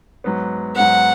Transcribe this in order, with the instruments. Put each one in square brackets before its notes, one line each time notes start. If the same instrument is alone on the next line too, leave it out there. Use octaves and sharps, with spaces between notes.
[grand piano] G#2 F#3 B3
[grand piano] G#2 F#3 B3 [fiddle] F#5